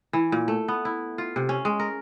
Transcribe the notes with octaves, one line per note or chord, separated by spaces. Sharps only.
E3
A#2
A3
B3
E4
F4
C3
C#4
G#3
A#4